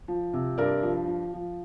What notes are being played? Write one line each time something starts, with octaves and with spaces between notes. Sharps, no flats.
F3
C3
G2 A#4 D5
F3
F3
F3